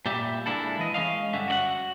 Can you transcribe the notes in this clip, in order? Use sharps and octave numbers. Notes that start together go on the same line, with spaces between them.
A#2 G3 G4 E5
G#3 A#3 D4 E4 A4
E3 D#5
G#3 C#4 D#5 F5
G2 D3 C#4 E5
F#4 D5 F#5